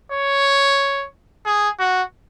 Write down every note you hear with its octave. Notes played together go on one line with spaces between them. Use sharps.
C#5
G#4
F#4